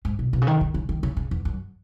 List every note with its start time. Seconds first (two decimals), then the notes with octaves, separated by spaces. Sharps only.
0.05 G#2
0.19 B2
0.33 B2
0.42 C#3
0.47 D#3
0.61 C#3
0.74 C#3
0.89 D#3
1.03 C#3
1.17 C#3
1.31 E2
1.45 F#2